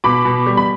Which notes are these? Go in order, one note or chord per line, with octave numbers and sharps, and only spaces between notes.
B2 B5 D6
B2
G3
B5